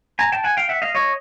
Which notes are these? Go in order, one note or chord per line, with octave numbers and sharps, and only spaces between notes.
G#5 A#5
G5 A5
F#5 G#5
F5 G5
E5 F#5
D#5 F5
C#5 D#5